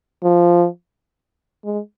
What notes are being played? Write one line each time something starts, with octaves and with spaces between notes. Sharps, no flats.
F3
G#3